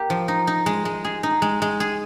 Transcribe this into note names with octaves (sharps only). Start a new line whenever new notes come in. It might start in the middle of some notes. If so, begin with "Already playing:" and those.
Already playing: A#3 G4
F3
D#4
D#4
G#3
G#3
G#4
D#4
G#3
G#3
G#4